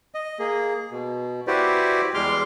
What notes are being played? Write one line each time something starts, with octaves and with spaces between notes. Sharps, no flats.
D#5
A#3 G#4
B2
E4 F#4 G4 B4 C5 D5
E2 G3 G#3 C6 D6 F6